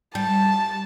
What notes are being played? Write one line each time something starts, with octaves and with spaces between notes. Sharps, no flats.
G3 A5